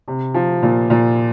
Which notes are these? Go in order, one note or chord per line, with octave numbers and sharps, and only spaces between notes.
C3
F3
A#2
A#2